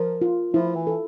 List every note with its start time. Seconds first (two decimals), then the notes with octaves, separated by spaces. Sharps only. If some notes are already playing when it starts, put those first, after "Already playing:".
Already playing: F3 A#4
0.21 F4
0.54 F3 E4
0.76 E3
0.87 A4